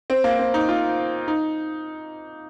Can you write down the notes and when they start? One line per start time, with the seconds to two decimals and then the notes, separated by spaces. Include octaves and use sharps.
0.10 C4
0.24 A#3
0.39 C4
0.54 D#4
0.69 F4
1.28 D#4